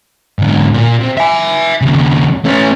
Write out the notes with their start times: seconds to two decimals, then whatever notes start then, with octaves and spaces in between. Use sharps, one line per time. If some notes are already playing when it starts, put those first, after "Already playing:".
0.39 G#2 D3
0.73 A#2
1.00 C3
1.18 E5 G#5
1.81 D#2 C#3
2.45 A3 C#4